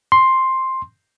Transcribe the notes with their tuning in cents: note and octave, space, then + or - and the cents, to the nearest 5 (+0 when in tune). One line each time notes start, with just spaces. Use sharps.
C6 +5